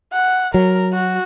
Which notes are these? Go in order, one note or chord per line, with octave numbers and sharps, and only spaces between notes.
F#5
F#3 A#4
F#4